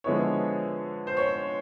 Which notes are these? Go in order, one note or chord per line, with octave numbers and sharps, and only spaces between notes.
D3 F3 G#3 B3 E4 C#5
C5
C#5